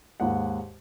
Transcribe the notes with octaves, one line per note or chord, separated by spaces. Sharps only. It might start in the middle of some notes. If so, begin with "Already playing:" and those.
D#2 G#2 F#5